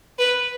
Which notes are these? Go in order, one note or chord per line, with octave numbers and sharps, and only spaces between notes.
B4